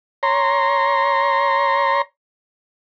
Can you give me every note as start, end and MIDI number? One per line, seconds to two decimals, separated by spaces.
0.23 2.02 73
0.23 2.02 82
0.23 2.02 84